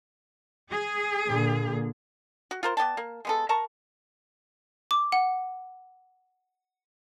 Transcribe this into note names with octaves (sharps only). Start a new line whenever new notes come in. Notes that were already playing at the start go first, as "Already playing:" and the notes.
G#4
A#2 D3 A#3
F#4
F4 A#4 C5
B3 D5 G5 A5
A#3
G#3 B3 A4
A#4 A5 A#5 C#6
D6
F#5